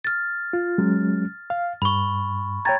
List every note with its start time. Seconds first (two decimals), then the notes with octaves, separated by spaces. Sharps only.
0.05 F6 A6
0.53 F4
0.78 F#3 G#3 C#4
1.50 F5
1.82 G2 B5 C#6
2.65 C#5 G5 A#5 G#6 A6